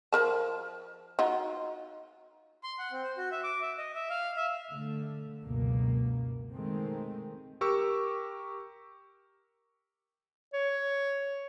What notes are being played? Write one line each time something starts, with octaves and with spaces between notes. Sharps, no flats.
F3 A#4 A5
D#4 F4 F#4
C6
F#5
C4
C5
F#4
E5
D6
E5
D#5
E5
F5
E5
D3 A3
C#2 F#2 B2 A#3
B2 D#3 G#3 A3 C4
G4 A#4 C#6 E6
C#5